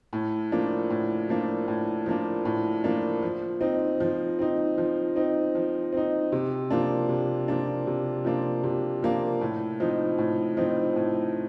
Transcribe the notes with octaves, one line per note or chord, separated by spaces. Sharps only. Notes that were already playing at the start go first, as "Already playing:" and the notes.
A2
F3 A#3 D4
A2
F3 A#3 D4
A2
F3 A#3 D4
A2
F3 A#3 D4
F3
C4 D#4
F3
C4 D#4
F3
C4 D#4
F3
C4 D#4
C3
F3 A#3 D4
C3
F3 A#3 D4
C3
F3 A#3 D4
C3
F3 A#3 D4
A2
F3 C4 D#4
A2
F3 C4 D#4
A2